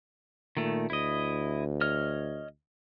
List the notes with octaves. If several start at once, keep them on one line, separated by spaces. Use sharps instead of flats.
A#2 D#3 A3
D2 E4 D#5
C#5 D#5 F6